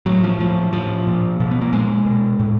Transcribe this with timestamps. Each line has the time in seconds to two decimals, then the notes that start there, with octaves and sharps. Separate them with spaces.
0.06 A2 F#3
0.23 F3
0.39 A2 F3
0.73 A2 F3
1.07 A#2
1.40 B2 F3
1.51 B3
1.62 A#3
1.73 A#2 G#3
2.06 B2
2.40 A2